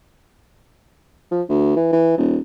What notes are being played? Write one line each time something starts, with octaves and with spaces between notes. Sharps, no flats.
F3
D2
E3
E3
D#1